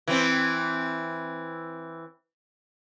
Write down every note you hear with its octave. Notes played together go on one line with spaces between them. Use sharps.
E3 C4